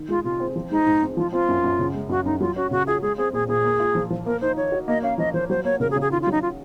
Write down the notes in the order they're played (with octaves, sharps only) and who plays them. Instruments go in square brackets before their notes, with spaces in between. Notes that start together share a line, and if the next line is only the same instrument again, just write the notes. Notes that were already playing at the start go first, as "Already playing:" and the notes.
Already playing: [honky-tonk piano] D#3
[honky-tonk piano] G#3 [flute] F4
[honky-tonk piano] C3 [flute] F4
[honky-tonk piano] C4
F3
[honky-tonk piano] G#3 [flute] D#4
[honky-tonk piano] G#2
C4
[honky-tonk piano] F3 [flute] F4
[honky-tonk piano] C4 [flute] F4
[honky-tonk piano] F#2
F#2
C#3
G#3
[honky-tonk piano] F#2 [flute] F#4
[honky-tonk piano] F#2 [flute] D#4
[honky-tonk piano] F#3 [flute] F4
[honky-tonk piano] C#4 [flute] F#4
[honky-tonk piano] C#3 [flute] F#4
[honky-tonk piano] F4 [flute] G#4
[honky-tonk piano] G#3 [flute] G#4
[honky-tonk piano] C4 [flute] G#4
[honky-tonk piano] A#2 [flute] G#4
[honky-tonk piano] A#2 [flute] G#4
[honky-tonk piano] A#3
F4
F3
F3
[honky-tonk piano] A#3 [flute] A#4
[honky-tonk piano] D#4 [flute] C5
[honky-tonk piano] D#3 [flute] C#5
[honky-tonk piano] F#4
[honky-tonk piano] A#3 [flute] D#5
[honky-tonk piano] C#4 [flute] F5
[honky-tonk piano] F3 [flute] D#5
[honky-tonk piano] F3 [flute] C5
[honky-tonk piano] F#3 [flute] C5
[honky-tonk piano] A#3 [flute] C#5
[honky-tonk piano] C#3 [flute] A#4
[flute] G#4
[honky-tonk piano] C#3
[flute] G#4
[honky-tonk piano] D#3 [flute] F4
[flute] F4
[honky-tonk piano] F#3 [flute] D#4
[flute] F4